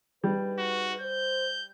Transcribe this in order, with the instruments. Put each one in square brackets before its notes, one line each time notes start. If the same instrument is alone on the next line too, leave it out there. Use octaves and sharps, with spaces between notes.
[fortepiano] G3 [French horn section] D#4 G#4 B4
[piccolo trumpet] F#4
[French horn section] C5 [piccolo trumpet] G6